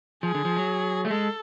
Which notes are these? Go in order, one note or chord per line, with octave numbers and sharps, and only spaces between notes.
F3 G#4
D3
F3
F#3
A3
G#3 A4